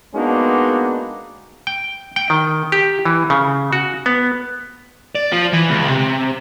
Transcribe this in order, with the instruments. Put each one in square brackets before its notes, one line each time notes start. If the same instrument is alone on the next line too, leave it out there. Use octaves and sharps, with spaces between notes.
[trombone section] G#3 A#3 B3 D4 D#4 F#4
[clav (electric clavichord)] G5
G5
D#3
G4
E3
C#3
F#4
B3
[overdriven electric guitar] D5
F3
E3
C#2
C3